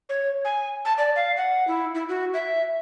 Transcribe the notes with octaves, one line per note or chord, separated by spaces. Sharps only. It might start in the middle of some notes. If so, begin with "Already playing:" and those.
C#5
G#5
A5
D5
F5
F#5
E4
E4
F#4
E5